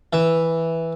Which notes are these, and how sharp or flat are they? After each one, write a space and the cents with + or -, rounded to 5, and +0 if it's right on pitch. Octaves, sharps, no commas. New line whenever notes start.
E3 -5 E5 +0